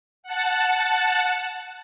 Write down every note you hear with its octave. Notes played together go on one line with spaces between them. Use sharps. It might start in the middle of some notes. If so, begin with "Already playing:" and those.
F#5 A5